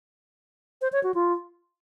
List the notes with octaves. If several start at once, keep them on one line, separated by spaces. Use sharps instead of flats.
C5
C#5
F#4
F4